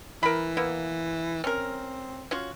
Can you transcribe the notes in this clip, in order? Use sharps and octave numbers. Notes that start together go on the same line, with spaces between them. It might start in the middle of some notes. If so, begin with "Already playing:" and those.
E3 A#4 B5
A#3 B3 E4
C4 C#4 A#4
C#4 F4 F#4